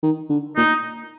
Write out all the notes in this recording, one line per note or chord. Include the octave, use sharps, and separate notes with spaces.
D#3
D3
A#2 D#4